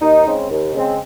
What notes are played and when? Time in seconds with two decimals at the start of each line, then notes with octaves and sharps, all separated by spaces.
0.01 D#2 D#4
0.25 C#3 G#3 C4
0.50 D#2
0.74 C#3 G#3 C4